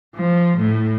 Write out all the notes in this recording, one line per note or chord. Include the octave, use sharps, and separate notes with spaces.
F3
A2